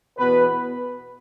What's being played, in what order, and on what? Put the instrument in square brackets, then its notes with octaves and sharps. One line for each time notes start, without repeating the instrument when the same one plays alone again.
[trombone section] E2 B2 B3 B4